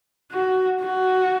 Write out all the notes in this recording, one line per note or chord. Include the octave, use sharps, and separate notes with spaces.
F#4
F#4